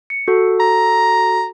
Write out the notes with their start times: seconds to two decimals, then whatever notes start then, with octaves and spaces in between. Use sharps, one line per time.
0.10 C#7
0.28 F#4 A4
0.60 A#5